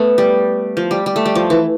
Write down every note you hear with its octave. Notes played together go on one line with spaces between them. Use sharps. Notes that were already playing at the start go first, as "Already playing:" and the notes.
Already playing: A3 B3
G3
F3
G3
G3
A3
G3
F3
E3